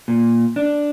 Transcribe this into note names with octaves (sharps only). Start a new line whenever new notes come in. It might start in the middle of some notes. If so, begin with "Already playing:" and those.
A#2
D4